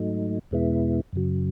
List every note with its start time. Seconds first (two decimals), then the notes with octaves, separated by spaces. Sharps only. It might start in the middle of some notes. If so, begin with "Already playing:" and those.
Already playing: G#2 F#3 A3 D#4
0.51 E2 B2 G#3 B3 E4
1.13 F#2 C#3 F#3